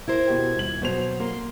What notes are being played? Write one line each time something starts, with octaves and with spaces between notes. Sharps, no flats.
E4 A#4 C5 G#6
B2 G4
D#1 F#7
B2 F#3 C5 F7
A#3 C6